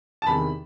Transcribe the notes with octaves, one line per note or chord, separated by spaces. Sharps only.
A5
E2 C3 D#3 B5